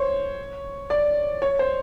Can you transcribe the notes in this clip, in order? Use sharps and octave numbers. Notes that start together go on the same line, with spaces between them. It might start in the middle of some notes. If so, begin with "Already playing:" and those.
Already playing: C5 C#5
D5
C#5
C5